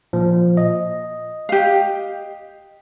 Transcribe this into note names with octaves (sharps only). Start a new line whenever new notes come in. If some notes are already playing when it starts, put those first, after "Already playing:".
A#2 F3
D#5
G4 F5